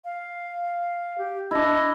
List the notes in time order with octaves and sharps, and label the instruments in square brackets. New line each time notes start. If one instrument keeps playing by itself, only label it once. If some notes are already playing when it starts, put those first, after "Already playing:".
[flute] F5
G4
[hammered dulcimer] D4 E4 [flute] D#5